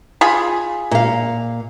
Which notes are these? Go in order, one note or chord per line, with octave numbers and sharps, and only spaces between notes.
F4 G#4 B5
A#2 F5